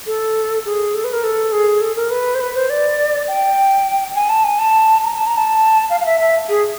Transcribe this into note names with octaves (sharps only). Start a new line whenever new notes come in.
A4
G#4
A4
B4
A#4
A4
G#4
A4
A#4
B4
C5
B4
C5
D5
G5
G#5
A5
G#5
A5
A#5
A5
A#5
A5
F5
F5
E5
E5
G#4